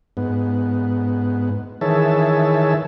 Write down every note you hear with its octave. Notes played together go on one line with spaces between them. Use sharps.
G#2 B3
D#3 E3 G#4 C#5 E5 A5